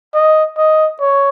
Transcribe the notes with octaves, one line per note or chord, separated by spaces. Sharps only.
D#5
D#5
C#5